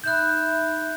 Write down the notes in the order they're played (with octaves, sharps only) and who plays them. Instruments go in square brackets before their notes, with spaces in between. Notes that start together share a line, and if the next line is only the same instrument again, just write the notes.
[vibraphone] D#4 E5 B5 [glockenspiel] F#6 G6